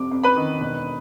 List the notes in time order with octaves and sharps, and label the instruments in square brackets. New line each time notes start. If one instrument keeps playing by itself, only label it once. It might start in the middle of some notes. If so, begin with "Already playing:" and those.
Already playing: [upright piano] F2 C3 D6
F2
B4 B5
D#3
E1